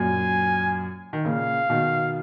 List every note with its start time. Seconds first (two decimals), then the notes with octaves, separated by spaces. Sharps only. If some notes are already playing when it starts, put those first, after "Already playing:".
Already playing: F#2 A#2 G#5
1.13 D#3
1.24 A#2 C#3 F5
1.70 B2 D#3